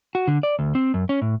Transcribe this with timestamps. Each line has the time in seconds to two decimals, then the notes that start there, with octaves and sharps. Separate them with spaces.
0.15 F#4
0.28 D3
0.43 D5
0.59 D2
0.75 C4
0.94 F#2
1.09 C#4
1.22 A2